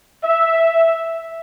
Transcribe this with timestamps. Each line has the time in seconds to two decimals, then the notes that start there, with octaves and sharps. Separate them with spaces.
0.23 E5